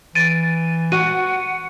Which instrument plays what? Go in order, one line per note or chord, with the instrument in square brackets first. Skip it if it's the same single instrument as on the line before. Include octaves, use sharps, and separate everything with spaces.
[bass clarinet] E3 [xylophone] A6 D7 D#7
[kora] F#4 [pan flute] F#5 [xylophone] D#7